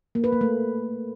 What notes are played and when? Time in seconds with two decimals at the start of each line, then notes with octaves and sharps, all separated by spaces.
0.15 A#3
0.24 B4
0.32 A#3
0.41 A3